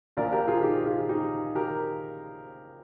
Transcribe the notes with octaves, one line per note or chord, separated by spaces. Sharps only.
A#1 A#2 F3 A#4 D5
G4 A#4
F4 G#4
D#4 G4
F4 G#4
D#4 G4
G4 A#4